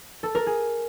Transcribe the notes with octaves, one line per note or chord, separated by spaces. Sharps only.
A4
A#4
G#4